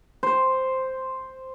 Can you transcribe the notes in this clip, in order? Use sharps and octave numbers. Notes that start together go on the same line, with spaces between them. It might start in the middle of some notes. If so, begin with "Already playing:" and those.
C5